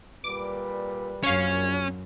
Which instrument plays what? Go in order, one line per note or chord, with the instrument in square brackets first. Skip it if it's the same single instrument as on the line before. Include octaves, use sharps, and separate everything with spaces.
[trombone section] A#2 G3 B4 [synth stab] D6
[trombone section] A#1 [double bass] F#2 [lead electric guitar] C#4 [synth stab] C#5 F5